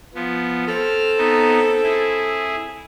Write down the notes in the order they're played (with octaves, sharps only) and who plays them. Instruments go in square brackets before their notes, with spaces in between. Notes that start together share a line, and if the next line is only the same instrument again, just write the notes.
[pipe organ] F3 B3
[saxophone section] C4 A4 [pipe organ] F6
[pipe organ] B3 D#4
E4 G#4